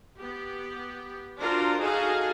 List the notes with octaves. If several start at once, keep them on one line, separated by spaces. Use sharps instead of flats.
B3 G4
D4 F4 F#4 A#4 C5
D#4 F#4 G#4 A4 D#5 F5